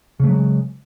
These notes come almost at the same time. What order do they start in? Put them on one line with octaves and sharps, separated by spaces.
C#3 A3 F#3 G#3